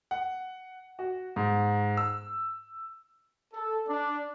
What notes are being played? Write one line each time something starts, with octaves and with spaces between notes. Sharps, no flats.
F#5
F#4
G#2
E6
A4
D4